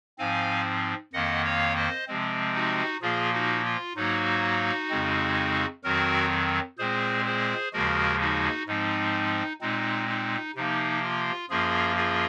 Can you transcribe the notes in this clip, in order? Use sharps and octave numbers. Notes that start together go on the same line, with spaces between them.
G#2 F3 C4 F5 G#5
F2 D#3 A#3 D#5 F#5
C#5 F5
C5 D#5
C3 F3 G#3 C4
D#4 F#4
A#2 F3 A#3 F4 G#4
D#4 F#4
F4
G#2 F#3 A#3 D#4 F#4
F2 C#3 G#3 C4
F2 D#3 F#3 C4 F#4 A#4
A#2 G#3 C4 G#4 C5
G#4 C5
D#2 C#3 F3 G#3 F#4 A#4
D#4 F#4
G#2 F3 G#3 C4 D#4
A#2 G#3 C4 D#4
D#4
C3 F3 A#3 D#4
F4
F#2 F3 A#3 F4 G#4
F4 G#4